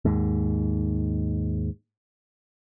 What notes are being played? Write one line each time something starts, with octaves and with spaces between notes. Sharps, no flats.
D#2 G#2